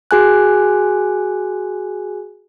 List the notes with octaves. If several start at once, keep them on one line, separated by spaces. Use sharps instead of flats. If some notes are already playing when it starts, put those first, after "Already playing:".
F#4 G#4 G#5 F#6